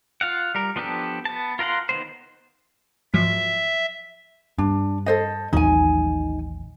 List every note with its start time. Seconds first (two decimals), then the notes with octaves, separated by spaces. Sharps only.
0.21 F4 F5 F#5
0.55 G3 A#4
0.76 F3 B3 D4 G4 A4
1.25 B3 A5
1.59 F4 A#4 F5 F#5 C6
1.89 D#3 B3 C5
3.14 G#2 F3 F#3 E5
4.58 G2 D4
5.06 A4 C5 D#5
5.53 A1 D#2 F#3 D#4 G#5